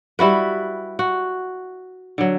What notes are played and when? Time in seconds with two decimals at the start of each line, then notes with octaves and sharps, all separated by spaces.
0.19 G3 E4 F#4 B4
0.99 F#4
2.18 D3 F#3